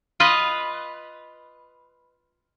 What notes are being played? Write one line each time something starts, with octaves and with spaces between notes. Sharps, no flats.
F4 B4 D#5